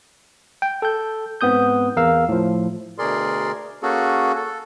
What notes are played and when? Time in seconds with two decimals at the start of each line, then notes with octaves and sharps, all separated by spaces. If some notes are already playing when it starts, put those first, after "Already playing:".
0.62 G5
0.82 A4 G6
1.41 G#2 B3 C4 D#6 G6
1.97 E2 A#4 F5 E6
2.29 A2 F3
2.98 D2 B2 G#4 A#4 D5 C6
3.83 A#3 C#4 F#4 G#4 A4
4.35 A4